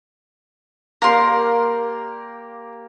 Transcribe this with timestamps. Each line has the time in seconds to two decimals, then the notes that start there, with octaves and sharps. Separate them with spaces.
1.02 A#3 G4 A#4 D5 C6